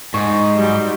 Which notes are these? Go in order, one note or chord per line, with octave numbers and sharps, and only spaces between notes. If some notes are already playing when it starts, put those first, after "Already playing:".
G#2 D#4 G5 C#6
F#3 G3